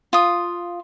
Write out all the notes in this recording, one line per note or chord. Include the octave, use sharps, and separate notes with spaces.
F4 D#6